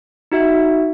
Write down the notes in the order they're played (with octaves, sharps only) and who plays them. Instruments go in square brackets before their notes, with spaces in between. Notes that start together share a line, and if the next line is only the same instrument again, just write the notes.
[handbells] D#4 F#4 E5